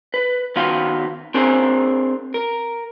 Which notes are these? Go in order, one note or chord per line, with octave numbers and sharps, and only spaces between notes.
B4
D#3 B3 F#4 B4 F5 C6
C4 D4 G#4 A#4 C5 G#5
A#4